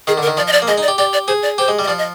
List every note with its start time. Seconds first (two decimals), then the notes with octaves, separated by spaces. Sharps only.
0.07 D#3 G#4
0.17 D3 A#4
0.27 D#3
0.37 F3 D5
0.47 D#5
0.52 D5
0.62 A#3
0.68 G#3 D#5
0.78 D#4 D5
0.88 G4
0.98 G4 D5
1.13 D5
1.28 G#4 C5
1.42 D5
1.58 G4 C5
1.68 G#3
1.79 G3
1.84 D#5
1.88 F3 D5
1.98 D#5